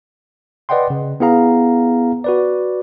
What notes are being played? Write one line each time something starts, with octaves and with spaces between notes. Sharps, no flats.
B4 D5 D#5 F#5 G5 C6
C#3
B3 E4 G#4 F5 A#5
F#4 B4 D5